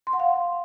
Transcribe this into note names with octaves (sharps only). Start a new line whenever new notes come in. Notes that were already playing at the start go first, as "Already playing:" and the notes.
C6
F#5
F5